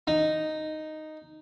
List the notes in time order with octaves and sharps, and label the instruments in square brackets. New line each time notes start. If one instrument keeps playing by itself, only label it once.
[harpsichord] D#4